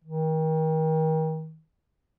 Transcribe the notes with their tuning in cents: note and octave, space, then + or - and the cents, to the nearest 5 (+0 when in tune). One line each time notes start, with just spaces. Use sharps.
D#3 +35